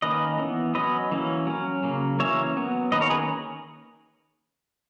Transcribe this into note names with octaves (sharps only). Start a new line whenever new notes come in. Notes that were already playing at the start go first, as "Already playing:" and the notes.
D#3 A#3 C#4 B4 D#5
E3 B3
F#3 C#4 B4 D#5
E3 A#3 C#4
F#3 C#4
C#3 F#3 A#3
E3 A#3 C#4 C#5 E5
F#3 B3
D#3 A#3 C#4 B4 D#5
A#4 C#5
G#4 B4